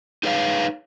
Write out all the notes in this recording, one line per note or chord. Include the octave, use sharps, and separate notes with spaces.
D#4 G#4 B4 C#5 F5